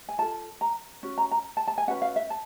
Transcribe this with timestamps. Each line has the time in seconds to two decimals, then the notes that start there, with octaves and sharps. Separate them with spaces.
0.09 G#5
0.18 F4 A4 A5
0.61 A#5
1.03 C#4 F#4
1.18 A#5
1.31 A#5
1.57 A5
1.67 A5
1.78 G#5
1.88 C#4 F#4 B4 F#5
2.02 F5
2.16 E5
2.30 A5